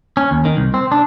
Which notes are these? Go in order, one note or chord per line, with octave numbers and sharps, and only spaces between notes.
C#4
D#2
D#3
C2
C4
D4